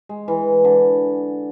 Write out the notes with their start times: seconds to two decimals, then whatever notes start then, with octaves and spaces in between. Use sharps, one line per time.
0.09 G#3
0.28 E3
0.64 D3